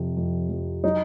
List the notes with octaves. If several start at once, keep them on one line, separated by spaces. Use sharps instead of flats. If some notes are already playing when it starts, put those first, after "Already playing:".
Already playing: F2 C3
F2
F2
F#3 D#4